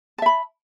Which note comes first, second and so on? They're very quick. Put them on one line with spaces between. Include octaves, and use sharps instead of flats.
A5 E5 B5